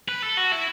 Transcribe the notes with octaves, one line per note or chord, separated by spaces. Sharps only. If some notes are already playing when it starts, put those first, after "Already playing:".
B4
A4
F#4
E4